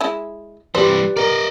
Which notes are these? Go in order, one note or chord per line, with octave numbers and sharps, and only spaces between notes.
G#3 E4
G2 E3 G4 B4 C5 D5
A#4 D5 D#5